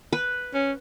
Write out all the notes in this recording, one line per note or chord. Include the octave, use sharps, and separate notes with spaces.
B4
C#4